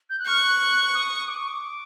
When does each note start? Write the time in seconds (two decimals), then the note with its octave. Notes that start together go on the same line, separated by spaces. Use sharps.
0.10 G6
0.19 F#6
0.26 C#6 F6
0.38 F#6
0.94 D#6
1.28 D6
1.38 C#6
1.48 D6